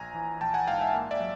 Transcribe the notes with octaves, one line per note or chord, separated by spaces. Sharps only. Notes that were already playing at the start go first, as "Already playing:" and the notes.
Already playing: A#1 G#5 A#5
E3
A#1 G5 A5
F#5 G#5
G#2 F5 G5
E5 F#5
A#3
D5 E5
F#3